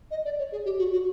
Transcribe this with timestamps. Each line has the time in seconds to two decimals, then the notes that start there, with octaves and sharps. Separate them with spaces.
0.10 D#5
0.24 D5
0.38 C#5
0.51 G#4
0.65 G4
0.78 F#4
0.92 F#4